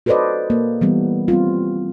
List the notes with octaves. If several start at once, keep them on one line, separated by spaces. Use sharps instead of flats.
F#4 A4 B4 C5 D5 D#5
A#3
E3 G3 B3
G3 C4 F4